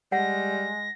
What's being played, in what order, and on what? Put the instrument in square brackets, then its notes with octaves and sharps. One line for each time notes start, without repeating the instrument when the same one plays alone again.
[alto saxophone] G3 [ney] G#3 [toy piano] F#5 [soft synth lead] A#6